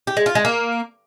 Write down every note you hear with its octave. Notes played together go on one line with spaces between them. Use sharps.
G4
G#3
F4
G#3
A#3